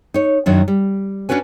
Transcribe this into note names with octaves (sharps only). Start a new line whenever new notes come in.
D#4 C#5
F#2 D#3 F#3 D4
G3
C#4 D4 F#4 B4 G#5